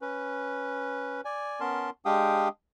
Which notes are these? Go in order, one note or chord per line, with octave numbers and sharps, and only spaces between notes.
C#4 B4
D5 G#5
B3 C#4 A#4 A5 C6
G#3 D4 G4 F5 G5 D#6